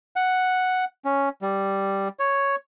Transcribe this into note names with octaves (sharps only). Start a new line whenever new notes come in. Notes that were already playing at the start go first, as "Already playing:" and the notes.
F#5
C#4
G3
C#5